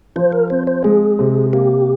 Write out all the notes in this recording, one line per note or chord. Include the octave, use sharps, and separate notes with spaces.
F3 C5
A#4
C4 C5
C5
G#3 G#4
C3
A#3 G4